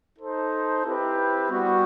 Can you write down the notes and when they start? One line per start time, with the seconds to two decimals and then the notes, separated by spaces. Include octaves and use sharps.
0.19 D#4 A4 C5
0.84 C4 E4 G4 B4
1.50 G3 B3 F#4